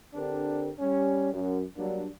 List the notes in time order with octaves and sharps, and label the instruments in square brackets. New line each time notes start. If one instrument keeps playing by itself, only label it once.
[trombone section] D3 C4 D4 G4 A#4
G3 C#4
F#2
F#3 G3 A#3 D4